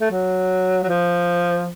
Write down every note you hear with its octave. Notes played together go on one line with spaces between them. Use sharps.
A3
F#3
F#3
F3